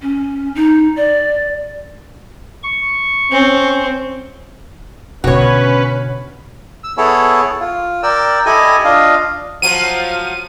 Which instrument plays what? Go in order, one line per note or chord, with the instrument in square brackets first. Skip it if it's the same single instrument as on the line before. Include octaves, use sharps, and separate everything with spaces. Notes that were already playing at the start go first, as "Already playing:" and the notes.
[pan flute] C#4
D#4
D5
[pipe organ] C#6
[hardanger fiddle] C4 [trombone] C#4
[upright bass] B2 D3 [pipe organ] C#4 B4 [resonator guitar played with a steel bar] F#4 C#5
[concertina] E6
B3 E4 G#4 A4 C#5
F4
A#4 D5 G5 E6
E4 G4 A4 D#5 G#5
D4 F4 D#5 F5
[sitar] F3 F#3 [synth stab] D#7